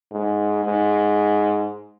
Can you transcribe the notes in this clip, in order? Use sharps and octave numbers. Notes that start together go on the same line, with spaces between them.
G#2
G#2